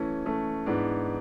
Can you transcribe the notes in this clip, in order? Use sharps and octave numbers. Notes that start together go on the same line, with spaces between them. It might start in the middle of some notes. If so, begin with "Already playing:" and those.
Already playing: E3 A3 C#4
E3 A3 C#4
G#2 E3 B3 D4